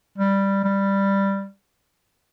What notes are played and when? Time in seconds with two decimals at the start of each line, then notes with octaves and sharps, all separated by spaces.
0.18 G3
0.64 G3